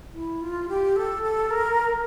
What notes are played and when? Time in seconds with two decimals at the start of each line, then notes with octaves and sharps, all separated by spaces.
0.13 E4
0.41 F4
0.69 G4
0.96 A4
1.23 A4
1.50 A#4